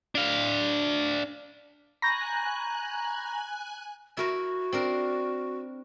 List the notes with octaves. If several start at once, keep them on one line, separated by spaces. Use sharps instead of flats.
D4 F5
G#5 A#5 B5 C#6 F#6 G6 A#6
E4 F#4 A#4
C4 D4 A#4